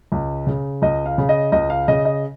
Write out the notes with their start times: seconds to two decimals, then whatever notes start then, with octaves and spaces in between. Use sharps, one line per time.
0.12 C#2
0.47 C#3
0.82 C#2 D#5
1.06 F5
1.18 C#3
1.29 D#5
1.52 C#2 D#5
1.70 F5
1.88 C#3 D#5
2.05 D#5